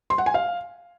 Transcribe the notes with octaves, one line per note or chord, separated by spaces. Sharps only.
C6
F#5
G#5
F5